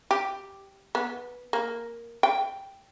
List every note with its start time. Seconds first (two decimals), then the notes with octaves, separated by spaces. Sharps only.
0.11 G4
0.95 B3
1.53 A#3
2.23 G5